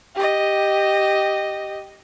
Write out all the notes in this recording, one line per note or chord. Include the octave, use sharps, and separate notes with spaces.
G4 D#5